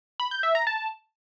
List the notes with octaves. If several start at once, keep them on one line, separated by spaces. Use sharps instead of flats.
B5
G6
E5
A#5
A5